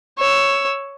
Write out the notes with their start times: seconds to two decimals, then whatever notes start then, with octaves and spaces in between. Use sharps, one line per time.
0.19 C#5 E6